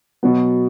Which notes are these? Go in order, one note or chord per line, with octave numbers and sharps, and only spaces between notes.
B2 F#3 B3